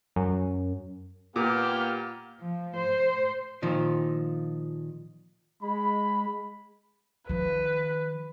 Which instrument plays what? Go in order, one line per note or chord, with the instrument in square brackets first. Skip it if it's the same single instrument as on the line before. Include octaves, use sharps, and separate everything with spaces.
[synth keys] F#2
[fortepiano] A#2 [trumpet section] A#3 G4 [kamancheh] B3 F6
[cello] F3
C5
[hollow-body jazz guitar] A#2 D#3 F3
[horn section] G#3 B5
[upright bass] D#3 F3 [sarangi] B4